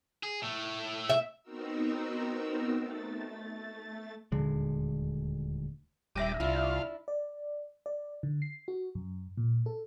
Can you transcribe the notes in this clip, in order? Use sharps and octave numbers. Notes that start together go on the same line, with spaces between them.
G#4
A2 A3
E5
B3 C4 D#4 F#4 A#4 E6
A3 A6
D#1 D2 D3 G#3
D#1 G3 E5 D6 A#6 D#7
C2 D4 E4 F4
D5
D5
D3
C7
F#4
F#2
A#2
A4